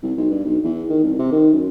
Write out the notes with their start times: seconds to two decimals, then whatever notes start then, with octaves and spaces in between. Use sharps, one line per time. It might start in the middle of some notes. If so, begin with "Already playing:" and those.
0.03 C2
0.17 B1
0.31 G2
0.45 B1
0.64 E2
0.90 D#3
1.04 C2
1.19 C3
1.32 D#3
1.53 F#2